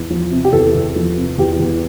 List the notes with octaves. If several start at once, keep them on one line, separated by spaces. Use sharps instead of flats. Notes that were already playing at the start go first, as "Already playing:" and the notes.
Already playing: E2
F3
C3
G4
E2 A4
E2
F3
C3
E2 G4
E2